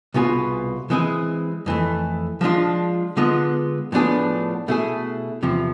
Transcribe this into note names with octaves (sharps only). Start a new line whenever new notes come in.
C2 B2 B3 F4 G#4
E3 G#3 C4 G#4
F2 E3 A3
F3 G#3 D4 F4
D3 G#3 B3 F4
A2 F3 B3 D4 G#4
B2 A3 E4 G#4
E2 C3 F3